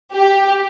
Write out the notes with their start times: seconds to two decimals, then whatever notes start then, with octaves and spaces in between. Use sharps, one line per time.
0.13 G4